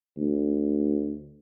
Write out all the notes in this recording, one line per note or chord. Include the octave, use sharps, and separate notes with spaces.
D2